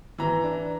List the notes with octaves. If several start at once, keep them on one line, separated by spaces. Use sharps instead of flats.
E3 A#5
D4